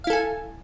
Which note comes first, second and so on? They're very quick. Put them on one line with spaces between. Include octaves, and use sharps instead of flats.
F5 E4 A4 G#5